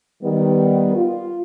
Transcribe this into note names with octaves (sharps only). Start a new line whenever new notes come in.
D#3 G3 B3
F4